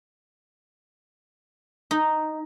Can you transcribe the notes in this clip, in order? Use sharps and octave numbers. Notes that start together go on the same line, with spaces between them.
D#4